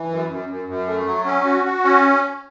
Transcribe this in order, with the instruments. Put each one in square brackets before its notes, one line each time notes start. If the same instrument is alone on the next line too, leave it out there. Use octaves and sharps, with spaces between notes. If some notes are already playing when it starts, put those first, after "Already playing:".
Already playing: [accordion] E3
F#2
F#2
F#2
F#2
A3
F#3
C#4
F#4
F#4
C#4